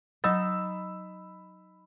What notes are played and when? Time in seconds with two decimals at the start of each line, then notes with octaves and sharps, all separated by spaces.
0.24 F#3 D#4 B5 E6